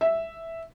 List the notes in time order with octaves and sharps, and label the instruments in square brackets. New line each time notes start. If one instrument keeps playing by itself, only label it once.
[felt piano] E5